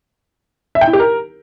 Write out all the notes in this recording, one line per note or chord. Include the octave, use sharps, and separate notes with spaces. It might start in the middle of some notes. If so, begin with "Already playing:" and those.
E5
G5
E4
G4
A#4